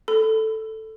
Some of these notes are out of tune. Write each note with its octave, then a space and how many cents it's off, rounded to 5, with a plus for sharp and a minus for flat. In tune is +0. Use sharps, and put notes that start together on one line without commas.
A4 +0 B5 +30